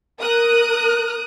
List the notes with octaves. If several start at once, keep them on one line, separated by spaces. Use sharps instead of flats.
A#4 D#6 F#6